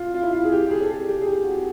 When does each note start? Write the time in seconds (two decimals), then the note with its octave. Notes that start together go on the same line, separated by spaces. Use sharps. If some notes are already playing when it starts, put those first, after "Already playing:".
Already playing: F4
0.14 F4
0.23 E4
0.33 F4
0.44 G#4
0.52 G4
0.66 G4
0.71 G#4
0.81 A4
0.89 G#4
1.08 G4
1.21 G#4
1.26 G4
1.44 F#4